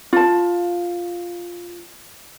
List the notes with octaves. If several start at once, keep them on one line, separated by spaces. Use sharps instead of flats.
F4 A5